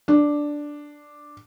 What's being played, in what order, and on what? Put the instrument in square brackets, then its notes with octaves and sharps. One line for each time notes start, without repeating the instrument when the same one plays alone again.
[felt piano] D4